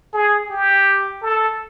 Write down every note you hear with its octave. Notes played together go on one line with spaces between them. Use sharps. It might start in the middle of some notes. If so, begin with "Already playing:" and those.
G#4
G4
A4